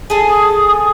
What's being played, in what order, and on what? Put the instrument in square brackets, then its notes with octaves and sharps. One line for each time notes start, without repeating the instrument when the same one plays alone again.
[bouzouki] G#4 A4
[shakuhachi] D#6